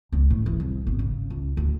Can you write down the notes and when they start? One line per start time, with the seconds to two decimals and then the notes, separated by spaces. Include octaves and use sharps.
0.12 C#2
0.30 A2
0.46 E3
0.60 C2
0.87 G#1
0.99 C#3
1.30 C#2
1.57 D2